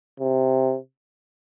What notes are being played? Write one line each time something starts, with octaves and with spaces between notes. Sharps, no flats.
C3